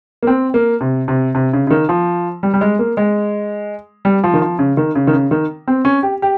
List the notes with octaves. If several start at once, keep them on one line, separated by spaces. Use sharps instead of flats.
A#3
C4
A#3
C3
C3
C3
C#3
C#3
D#3
F3
G3
G3
G#3
A#3
G#3
G3
F3
D#3
F3
C#3
D#3
C#3
D#3
C#3
D#3
C4
C#4
G4
G4